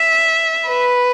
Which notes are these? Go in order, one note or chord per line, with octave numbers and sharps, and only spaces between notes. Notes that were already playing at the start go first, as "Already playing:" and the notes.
Already playing: E5
B4